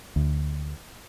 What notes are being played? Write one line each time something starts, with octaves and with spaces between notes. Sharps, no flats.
D2